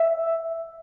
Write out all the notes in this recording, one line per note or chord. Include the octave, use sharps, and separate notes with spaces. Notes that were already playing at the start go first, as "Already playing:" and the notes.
Already playing: E5